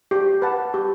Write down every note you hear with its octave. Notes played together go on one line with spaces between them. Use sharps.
G4
B4 F#5 A5
G4